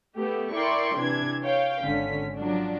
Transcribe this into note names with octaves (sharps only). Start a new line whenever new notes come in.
A3 B3 G4
E4 A#4 D5 G5 C6 C#6
C3 E3 D4 G#6
C#5 F5 G5
G#1 D3 C#4 B6
F3 F#3 D4